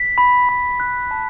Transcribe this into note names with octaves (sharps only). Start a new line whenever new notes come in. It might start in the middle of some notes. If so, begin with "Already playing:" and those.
Already playing: B6
B5
B5
F#6
A5